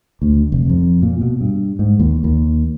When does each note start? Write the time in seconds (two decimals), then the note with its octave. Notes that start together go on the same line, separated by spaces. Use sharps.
0.22 D2
0.52 F1
0.69 F2
1.02 A#2
1.21 B2
1.41 G2
1.79 G#2
1.99 D#2
2.24 D#2